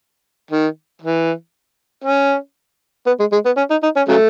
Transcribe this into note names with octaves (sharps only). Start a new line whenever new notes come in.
D#3
E3
C#4
B3
G#3
G#3
B3
C#4
D#4
D#4
C#4
C#3 F#3 A3